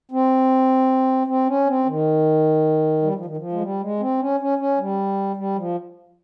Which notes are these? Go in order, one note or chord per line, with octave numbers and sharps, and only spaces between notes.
C4
C4
C#4
C4
D#3
G3
F3
D#3
F3
G#3
G3
G#3
C4
C#4
C#4
C#4
G3
G3
F3